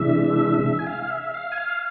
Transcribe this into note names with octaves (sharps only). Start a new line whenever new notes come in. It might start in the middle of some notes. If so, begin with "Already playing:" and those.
Already playing: C3 E3 G#3 D4 E5
G#5
F5
F5
E5
F5
G#5
F5